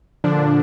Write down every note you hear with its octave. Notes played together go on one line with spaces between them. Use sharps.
A#2 D3 F3 D4